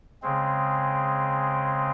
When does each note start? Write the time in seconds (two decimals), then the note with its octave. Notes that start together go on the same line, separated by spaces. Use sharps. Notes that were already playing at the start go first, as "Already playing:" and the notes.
0.22 C#3 G#3 C4